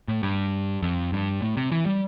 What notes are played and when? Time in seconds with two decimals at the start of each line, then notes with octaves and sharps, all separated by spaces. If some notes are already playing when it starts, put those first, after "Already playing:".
0.08 A2
0.23 G2
0.82 F2
1.12 G2
1.42 A2
1.57 C3
1.72 E3
1.86 G3